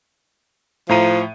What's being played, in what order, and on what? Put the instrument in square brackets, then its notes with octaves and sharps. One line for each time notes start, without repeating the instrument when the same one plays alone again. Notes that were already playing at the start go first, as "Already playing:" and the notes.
[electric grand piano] A2 A#5 D#7 [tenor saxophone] F3